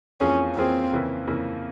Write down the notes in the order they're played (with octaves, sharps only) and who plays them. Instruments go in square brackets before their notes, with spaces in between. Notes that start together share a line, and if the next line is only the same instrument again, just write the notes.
[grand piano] F2 E3 A#3 F4 G#4 [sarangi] C#4
[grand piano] F2 E3 A#3 F4 G#4 [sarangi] C4
[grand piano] F2 C#3 E3 A#3 E4
F2 C#3 E3 A#3 E4